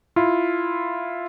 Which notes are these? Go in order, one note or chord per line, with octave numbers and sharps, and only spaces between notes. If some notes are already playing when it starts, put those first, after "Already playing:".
E4 F4